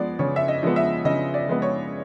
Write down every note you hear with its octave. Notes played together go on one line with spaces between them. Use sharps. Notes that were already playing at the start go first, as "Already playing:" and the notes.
Already playing: F3 G#3 B3 D5
C#3 C#5
E5
D#5
F3 G#3 B3
E5
C#3 D#5
D5
F3 G#3 B3
C#5